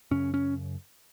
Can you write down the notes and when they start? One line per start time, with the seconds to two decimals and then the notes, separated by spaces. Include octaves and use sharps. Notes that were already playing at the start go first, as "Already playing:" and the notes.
0.11 F#2 C#3 C#4
0.34 C#4